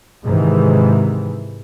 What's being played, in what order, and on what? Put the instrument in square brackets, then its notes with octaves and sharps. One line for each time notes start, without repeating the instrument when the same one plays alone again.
[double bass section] G#2 C3 D#3 E3